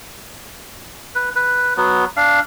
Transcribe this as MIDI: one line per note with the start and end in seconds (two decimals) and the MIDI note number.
1.15 1.30 71
1.36 1.74 71
1.77 2.05 54
1.77 2.05 59
2.17 2.40 62
2.17 2.40 77